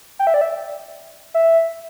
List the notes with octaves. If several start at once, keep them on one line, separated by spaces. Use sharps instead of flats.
G5
E5
D5
E5
E5